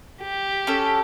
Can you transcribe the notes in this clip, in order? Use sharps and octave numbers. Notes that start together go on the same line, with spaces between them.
G4
C#4 A4